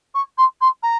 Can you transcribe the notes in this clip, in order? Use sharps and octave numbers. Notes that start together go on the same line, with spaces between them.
C#6
C6
C6
A#5